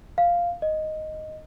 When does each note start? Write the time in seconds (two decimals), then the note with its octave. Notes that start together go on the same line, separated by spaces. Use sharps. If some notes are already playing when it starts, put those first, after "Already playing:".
0.18 F5
0.62 D#5